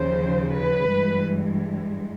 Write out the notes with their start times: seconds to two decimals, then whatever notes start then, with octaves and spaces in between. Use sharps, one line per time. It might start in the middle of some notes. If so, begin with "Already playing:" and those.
Already playing: D#2 C#3 F3 C5
0.56 B4
0.91 G2 E3 G#3